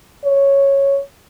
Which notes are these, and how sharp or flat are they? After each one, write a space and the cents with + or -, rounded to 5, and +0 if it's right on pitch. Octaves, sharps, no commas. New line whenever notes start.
C#5 -5